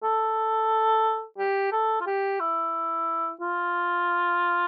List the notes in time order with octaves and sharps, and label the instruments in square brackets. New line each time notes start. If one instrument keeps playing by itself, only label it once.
[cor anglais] A4
G4
A4
F4
G4
E4
F4